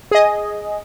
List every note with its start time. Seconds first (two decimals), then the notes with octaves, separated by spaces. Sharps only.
0.11 G#4 D#5